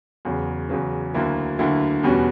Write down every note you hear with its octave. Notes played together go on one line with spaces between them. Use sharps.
E2 C#3 F#3
E2 C#3 F#3
D2 D3 F#3 A#3 E4
D2 D3 F#3 A#3 E4
E2 B2 G3 C#4 F#4